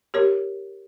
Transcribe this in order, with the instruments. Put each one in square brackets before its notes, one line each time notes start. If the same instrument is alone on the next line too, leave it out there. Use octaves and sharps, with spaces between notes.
[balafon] G4 A#4 C#5